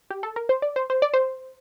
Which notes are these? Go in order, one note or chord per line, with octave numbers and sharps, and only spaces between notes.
G4
A4
A#4
C5
D5
C5
C5
D5
C5